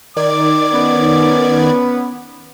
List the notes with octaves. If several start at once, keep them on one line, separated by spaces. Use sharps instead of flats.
D#3 D5 D6 G#6
B3 C#4